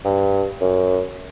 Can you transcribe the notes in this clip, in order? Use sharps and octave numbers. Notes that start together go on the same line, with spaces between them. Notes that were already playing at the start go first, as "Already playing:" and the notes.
G2
F#2